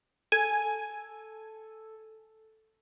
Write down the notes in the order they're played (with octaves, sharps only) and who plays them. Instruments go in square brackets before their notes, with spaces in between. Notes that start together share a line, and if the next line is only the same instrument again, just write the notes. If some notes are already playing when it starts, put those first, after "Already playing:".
[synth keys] A4 [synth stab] G#5